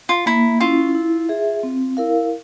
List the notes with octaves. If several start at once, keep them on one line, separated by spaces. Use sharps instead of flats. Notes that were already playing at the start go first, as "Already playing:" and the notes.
F4
A#3 E4
C#4 E4 F4
E4
G#4 E5
C4
E4 A#4 F5